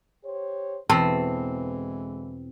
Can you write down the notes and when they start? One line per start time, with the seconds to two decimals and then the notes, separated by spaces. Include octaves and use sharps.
0.24 G4 C5 C#5
0.90 E2 B2 D3 E3 G#3 C4 A4 A5